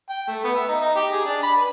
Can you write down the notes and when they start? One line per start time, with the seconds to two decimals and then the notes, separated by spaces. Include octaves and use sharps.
0.09 G5
0.28 A3
0.44 B3
0.55 E5
0.68 D#4
0.81 D#4
0.95 G4
1.12 G#4
1.25 D4
1.43 B5
1.56 B4